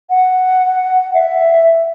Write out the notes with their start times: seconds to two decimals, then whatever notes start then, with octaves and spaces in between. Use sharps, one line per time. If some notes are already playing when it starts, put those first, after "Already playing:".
0.10 F#5
1.14 E5